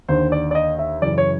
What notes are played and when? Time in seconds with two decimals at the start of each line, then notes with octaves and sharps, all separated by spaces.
0.08 D#2 D3 C5
0.32 D5
0.51 D5
0.55 D#5
0.79 E5
1.02 F#2 C#3 E3 D5
1.18 C#5